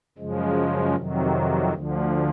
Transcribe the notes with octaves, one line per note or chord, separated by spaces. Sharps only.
F#2 C#3 F3 G#3
F2 C3 D#3 F#3
D2 D3 F3